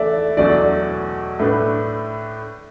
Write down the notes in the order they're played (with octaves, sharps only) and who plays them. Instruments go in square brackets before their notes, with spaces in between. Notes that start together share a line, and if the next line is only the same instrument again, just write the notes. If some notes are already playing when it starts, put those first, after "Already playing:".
Already playing: [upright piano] E3 A3 [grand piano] A4 D5 E5
[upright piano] E2 B2 F#3 A3 D4 [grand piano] D5
[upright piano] A2 A3 D4 B4